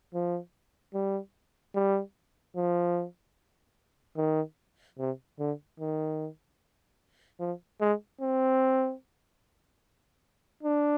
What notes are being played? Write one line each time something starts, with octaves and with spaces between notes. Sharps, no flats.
F3
G3
G3
F3
D#3
C3
D3
D#3
F3
G#3
C4
D4